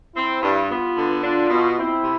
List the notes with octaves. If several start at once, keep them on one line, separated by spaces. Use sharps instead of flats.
C4 E4
G2
B3 F4
D3
D4 F4
B2
C4 E4
C3